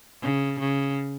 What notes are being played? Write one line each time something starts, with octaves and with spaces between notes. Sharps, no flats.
C#3
C#3